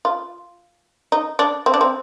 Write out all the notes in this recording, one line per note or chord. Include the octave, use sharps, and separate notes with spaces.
F4
D#4
D4
C4
D4
C4